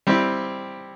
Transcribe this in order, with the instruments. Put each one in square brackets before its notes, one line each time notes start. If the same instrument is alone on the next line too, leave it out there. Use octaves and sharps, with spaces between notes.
[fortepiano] G3 C4 E4 G4